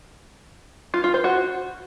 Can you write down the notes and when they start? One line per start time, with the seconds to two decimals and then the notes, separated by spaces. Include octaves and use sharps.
0.94 F4
1.04 F4
1.14 C5
1.24 F#4